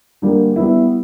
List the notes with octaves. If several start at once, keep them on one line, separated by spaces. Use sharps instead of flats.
D3 G3 A#3
G3 B3 E4